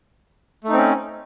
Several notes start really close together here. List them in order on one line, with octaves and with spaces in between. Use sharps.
A3 D#4 C4 C#4